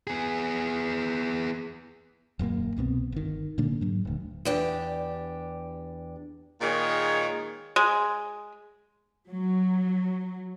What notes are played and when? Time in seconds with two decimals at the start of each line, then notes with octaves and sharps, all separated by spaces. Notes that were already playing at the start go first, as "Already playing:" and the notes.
0.07 B3 G#4
2.39 D#1 F#2 G#3 A#3
2.77 C2 B2 B3 C4
3.12 G1 D#3
3.58 A#2 D3 A#3 D4
3.81 G#2 F#3
4.05 D#1 D2
4.45 E2 D4 G4
6.61 A#2 D#3 G#3 C#5
7.76 G#3
9.28 F#3